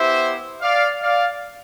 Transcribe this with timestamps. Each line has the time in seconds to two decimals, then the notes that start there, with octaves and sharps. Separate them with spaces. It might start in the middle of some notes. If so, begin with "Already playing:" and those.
Already playing: B3 E4 G4 C5 E5
0.61 D5 F5
1.01 D5 F5